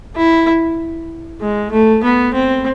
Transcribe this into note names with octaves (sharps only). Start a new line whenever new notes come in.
E4
G#3
A3
B3
C4